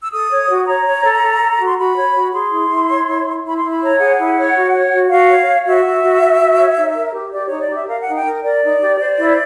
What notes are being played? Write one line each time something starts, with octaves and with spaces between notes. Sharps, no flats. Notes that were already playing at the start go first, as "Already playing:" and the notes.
E6
A4 D#6
C#5
F#4
C#5 A#5
C#5
A4
A4
A4
F#4
C6
F#4 B5
C#5
F#4
G#4 C6
E4
E4
C#5
E4
E4
E4 B5
C6
E4
B5
C#5 A#5
G#4 F#5
E4
C#5
F#4
C#5
F#4
F#4 F5
C#5
C#5
F#4 E5
F#4
F#4
F#4
F#4
C#5
D#4
A#4
G4
G4 D5
D#4 C#5
D5
G4 E5
A#4 F5
D#4 F#5
G5
A#4
A#4 D5
D#4
G4
C5
E4